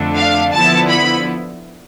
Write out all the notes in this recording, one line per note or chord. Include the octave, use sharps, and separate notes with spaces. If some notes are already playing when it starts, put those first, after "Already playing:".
Already playing: F2 D3 A3 D4
F5
D3 F3 B3 E4 A5
B5